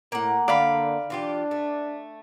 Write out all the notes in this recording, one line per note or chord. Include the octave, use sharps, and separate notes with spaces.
A2 A#3 F#5
D3 D5 F5 B5
E3 D4 F4 G4
A3